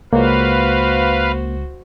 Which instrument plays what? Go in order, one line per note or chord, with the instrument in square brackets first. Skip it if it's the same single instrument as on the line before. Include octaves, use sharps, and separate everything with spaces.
[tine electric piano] C#2 [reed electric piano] A#3 [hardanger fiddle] F#4 C5 [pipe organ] B4 F5